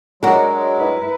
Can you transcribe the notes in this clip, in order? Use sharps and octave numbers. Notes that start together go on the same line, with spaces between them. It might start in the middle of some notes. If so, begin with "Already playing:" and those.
F#3 G#3 D4 F#4 A#4
E4 B4